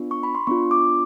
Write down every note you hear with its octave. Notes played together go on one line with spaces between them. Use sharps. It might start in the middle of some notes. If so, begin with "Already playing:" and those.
Already playing: B3 D4 F4
C#6
B5
C6
B3 D4 F4 C#6
D6